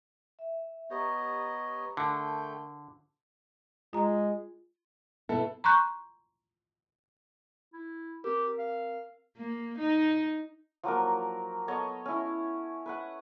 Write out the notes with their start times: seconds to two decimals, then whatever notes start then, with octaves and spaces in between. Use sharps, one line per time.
0.39 E5
0.91 B3 G4 C#5 D#5 A#5 C#6
1.97 D3 A3 A#4 G5 A5
3.93 G#3 F4 A#5
5.29 B2 B3 E4 A4
5.64 A#5 C6 C#6 F#6 G6
7.73 E4
8.24 C4 G4 A#4
8.59 F5
9.37 A#3
9.78 D#4
10.83 F3 F#3 A#3 A#4
11.68 B3 A4 C#5 D#5
12.06 C#4 E4
12.86 B4 E5 F#5